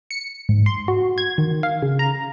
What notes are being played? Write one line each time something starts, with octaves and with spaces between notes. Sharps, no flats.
C#7
G#2
C6
F#4
G#6
D#3
F5
C#3
A#5